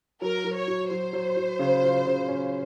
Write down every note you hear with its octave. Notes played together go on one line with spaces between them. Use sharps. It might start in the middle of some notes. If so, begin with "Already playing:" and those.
F#3 A#4
F#3
C#5
F#3
F#3 C5
F#3
F#3
C#3
F4
C#3
C#4